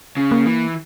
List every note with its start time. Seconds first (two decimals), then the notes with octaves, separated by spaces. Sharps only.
0.17 C#3
0.32 A#3
0.46 E3